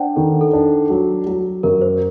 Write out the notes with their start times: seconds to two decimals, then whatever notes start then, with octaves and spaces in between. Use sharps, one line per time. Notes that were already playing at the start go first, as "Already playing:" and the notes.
Already playing: D4 C5 D5 F#5 G5
0.16 D#3 A4
0.41 A4
0.53 D4
0.90 F#3
1.26 F#3
1.63 F#2 A#4
1.81 C5